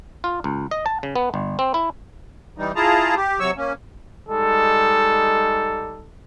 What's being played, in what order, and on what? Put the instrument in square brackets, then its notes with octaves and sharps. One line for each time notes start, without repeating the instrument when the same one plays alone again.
[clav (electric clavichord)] F4
C#2
D#5
A5
C#3
B3
G1
C4
E4
[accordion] E3 G3 D#4
E4 F4 G#4 A5 A#5
G4
C3 F#3 C#5 C#6 E6
A#3 C#4
[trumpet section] G3 G#3 D#4 A4